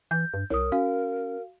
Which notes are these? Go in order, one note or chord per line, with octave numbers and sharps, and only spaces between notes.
E3 G6
G2
C2 A#4 C#5 D#6
C#4 F#4 F5